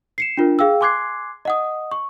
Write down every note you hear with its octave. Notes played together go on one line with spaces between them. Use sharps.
C7 C#7 E7
D4 F4 A#4
G#4 F5 G5 E6
G#5 C6 D6 F#6 G#6 C7
D#5 F#5 D#6
C#6